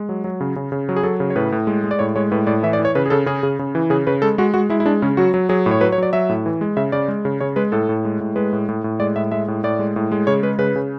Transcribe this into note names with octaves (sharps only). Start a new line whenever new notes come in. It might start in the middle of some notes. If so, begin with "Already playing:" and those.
Already playing: G#3
F#3
F#3
C#3
C#3
C#3
F#3
G#4
F#3 A4
C#3
C#5
A2 B4
A2
G#3
G#3
D5
A2 C#5
G#3 C#5
A2 B4
A2 D5
E3 E5
D5
E3
C#5
C#3 B4
G#4
C#3 A4
C#3 G#4
C#3
C#3
E3
C#3 G#4
C#3 B4
G#3 A4
G#3 F#4
G#3 F#4
G#3 E4
E4
G#3 D4
C#3 C#4
F#3 F#4
F#3
F#3 G#4
A2
C#5
F#3 B4
C#5
F#3 D5
F#3 E5
A2
E3
G#3
C#3 E5
C#3 D5
G#3
C#3
C#3 C#5
G#3 B4
A2 A4
A2
G#3
A2
G#3 B4
A2
A2
A2
G#3 D5
A2 E5
G#3 E5
A2
A2 D5
G#3
A2
G#3
C#3 C#5
G#3 B4
C#3 B4
C#3